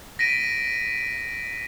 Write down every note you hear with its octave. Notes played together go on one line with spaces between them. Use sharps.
A#6 B6 D7 D#7